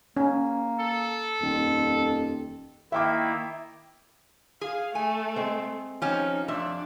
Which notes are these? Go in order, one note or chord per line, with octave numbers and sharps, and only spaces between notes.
A#3 C#4
A4
D#1 F2
D#3 A#3 E4 E5 G5 D6
G#4 F5
A3 G#5
G#3 C4
F3 C#4 D#4 G4
F2 D4 E5